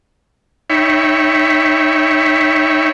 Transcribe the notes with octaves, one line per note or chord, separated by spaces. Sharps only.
D#4 C#5 E5 G5 B5 C#6